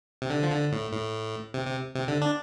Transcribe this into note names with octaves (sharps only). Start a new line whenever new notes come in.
C3
D3
F3
D3
A2
A2
C3
C3
C3
D3
D4